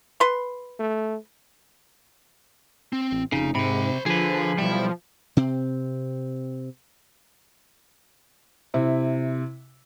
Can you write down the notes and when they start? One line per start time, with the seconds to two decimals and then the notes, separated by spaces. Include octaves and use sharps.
0.20 B4 C6
0.79 A3
2.93 C4
3.12 A1
3.32 F1 C#3 D#4
3.55 G#2 C3 C5 B5
4.06 D3 F3 G#4 B4
4.58 B1 G3 E4
5.37 C3 C4
8.74 C3 E4